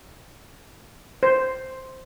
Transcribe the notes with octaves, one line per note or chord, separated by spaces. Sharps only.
C5